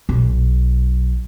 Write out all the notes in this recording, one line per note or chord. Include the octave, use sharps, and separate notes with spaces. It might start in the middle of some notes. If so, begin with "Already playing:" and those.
B1